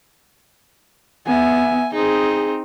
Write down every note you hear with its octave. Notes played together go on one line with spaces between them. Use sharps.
B3 E5 G#5
C4 D#4 G#4